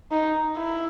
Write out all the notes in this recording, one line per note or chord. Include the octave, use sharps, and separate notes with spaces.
D#4
E4